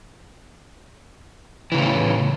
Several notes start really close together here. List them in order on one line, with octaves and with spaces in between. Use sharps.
E3 C#3 A2